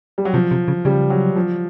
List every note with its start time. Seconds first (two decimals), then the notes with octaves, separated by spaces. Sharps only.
0.18 G3
0.25 F#3
0.34 C3 F3
0.51 C3
0.68 C#3
0.85 C#3 G3
1.10 F#3
1.36 F3